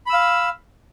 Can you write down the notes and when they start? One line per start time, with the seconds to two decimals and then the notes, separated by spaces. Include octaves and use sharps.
0.06 B5
0.10 E6
0.13 F5